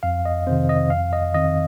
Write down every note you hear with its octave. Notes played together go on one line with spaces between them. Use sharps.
F2 F5
D#5
C3 D#3 C4 C5
D#5
F2 F5
D#5
D#3 C4 D#5